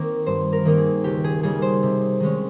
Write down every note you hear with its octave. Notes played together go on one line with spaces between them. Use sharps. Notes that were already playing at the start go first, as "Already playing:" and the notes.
Already playing: D#3 A#3 C4 D#4
G2 C5
A#4
D#3 A#3 D#4
G#4
C#2 G4
G#4
C#3 G3 A#3 D#4 G#4
C5
C3
D#3 G#3 C#4